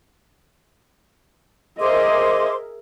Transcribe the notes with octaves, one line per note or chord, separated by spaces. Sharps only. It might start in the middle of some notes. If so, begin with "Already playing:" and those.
G#4 A#4 C5 D#5 E5 C6 D6